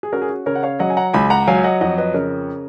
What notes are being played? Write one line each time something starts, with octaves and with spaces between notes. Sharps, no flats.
G#4
C#4 F#4 A#4
G#4
F#4
C#3 A#4 C#5
F#5
C#5 F5
F#3 D#5 F#5
G#5
F#5 A#5
C#2 G#5 B5
F#5 A#5
F#3 F5 G#5
F5
D#5 F#5
F2 D#5 F#5
B4 D#5
C#3 A#4 C#5